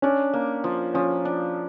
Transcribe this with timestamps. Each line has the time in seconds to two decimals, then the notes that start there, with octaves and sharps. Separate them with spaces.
0.02 C#4 D4
0.34 A#3
0.64 F3
0.94 F3 C#4
1.25 D4